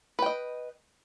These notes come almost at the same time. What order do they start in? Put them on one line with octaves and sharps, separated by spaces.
B4 G5 D#5